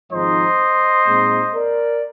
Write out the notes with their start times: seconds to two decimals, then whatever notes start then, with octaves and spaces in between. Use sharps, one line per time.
0.12 G#1 G#2 F3 G#3 D#4 C5 D#5
1.07 A#2 G#3 C4 D#4
1.55 A#4 D5